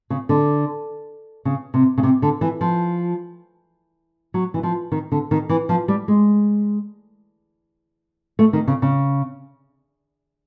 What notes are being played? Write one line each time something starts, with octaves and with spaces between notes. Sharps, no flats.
C#3
D3
C#3
C3
C#3
C3
D3
E3
F3
F#3
E3
F3
D#3
D3
D#3
E3
F3
G3
G#3
A3
D#3
C#3
C#3